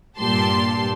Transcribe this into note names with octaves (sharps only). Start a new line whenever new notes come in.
G2 A#2 G4 A5 C6